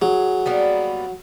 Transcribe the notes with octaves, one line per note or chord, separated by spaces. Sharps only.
F#3 G#4
G3 A#3 B3